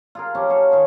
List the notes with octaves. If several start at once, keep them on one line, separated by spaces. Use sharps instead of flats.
F4 G#4 A#4
F3 C#4 G4
F#3 F5 A5 C#6
D#3 G#4 C#5